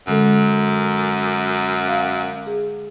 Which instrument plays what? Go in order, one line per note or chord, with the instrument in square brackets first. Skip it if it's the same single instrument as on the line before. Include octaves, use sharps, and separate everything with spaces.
[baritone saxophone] F#2 [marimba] D3 G#3 A4
[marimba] F5
G#4